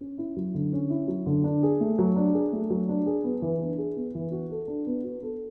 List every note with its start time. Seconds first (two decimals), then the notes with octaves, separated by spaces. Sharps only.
0.01 C#4
0.18 E4
0.36 F#3
0.54 D3
0.73 C#4
0.90 E4
1.08 F#3
1.26 D3
1.44 D4
1.63 G#4
1.81 A3
1.99 F#3
2.16 D4
2.34 G#4
2.53 A3
2.70 F#3
2.89 D4
3.06 G#4
3.24 B3
3.42 E3
3.60 D4
3.78 G#4
3.96 B3
4.15 E3
4.32 F#4
4.51 A4
4.68 D4
4.86 B3
5.04 F#4
5.23 A4